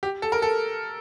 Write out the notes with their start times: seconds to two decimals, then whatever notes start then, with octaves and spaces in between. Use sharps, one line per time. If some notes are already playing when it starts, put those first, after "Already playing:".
0.03 G4
0.22 A4
0.32 A#4
0.42 A4